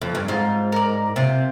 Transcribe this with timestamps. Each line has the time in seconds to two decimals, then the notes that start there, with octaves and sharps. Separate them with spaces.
0.02 F2
0.15 G2
0.28 G#2 F4
0.72 A#4 D5
1.16 C3 F4